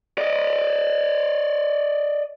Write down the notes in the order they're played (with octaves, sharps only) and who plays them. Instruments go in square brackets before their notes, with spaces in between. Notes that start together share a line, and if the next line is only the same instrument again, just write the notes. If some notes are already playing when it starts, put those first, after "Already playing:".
[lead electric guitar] D5 D#5